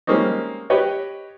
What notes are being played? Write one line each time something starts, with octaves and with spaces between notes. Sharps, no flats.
G3 G#3 A#3 C4 C#4 D#4
G4 B4 C#5 D#5